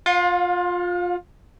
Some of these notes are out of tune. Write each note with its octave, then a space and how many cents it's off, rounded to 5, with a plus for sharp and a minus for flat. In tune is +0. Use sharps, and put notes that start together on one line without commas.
F4 +15 F5 +45